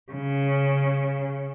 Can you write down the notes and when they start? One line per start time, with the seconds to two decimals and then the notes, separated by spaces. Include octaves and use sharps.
0.12 C#3